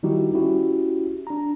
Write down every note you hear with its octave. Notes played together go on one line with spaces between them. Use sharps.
D#3 G3 D#4 E4 F#4 G4
C#4 E4 F#4 G4
D4 A#5